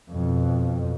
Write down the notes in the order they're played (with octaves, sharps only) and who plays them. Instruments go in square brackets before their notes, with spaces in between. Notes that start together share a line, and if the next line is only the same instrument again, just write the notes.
[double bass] F2 B2